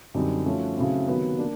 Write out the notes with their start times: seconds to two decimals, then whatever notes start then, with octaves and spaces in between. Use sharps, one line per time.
0.14 F#2 D3 G3 C4 D#4
0.45 F3 A3 C#4 F#4
0.77 C#3 F#3 A3 C4 E4
1.08 C3 D#3 F#3 B3
1.38 A#3 D4